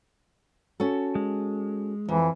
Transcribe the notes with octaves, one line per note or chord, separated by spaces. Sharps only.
C#4 F#4 A4
G#3
F2 E3